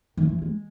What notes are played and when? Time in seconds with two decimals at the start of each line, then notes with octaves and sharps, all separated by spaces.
0.17 D#3
0.29 E3
0.42 G#3